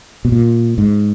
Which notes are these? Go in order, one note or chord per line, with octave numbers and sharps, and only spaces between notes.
B2
A#2
G#2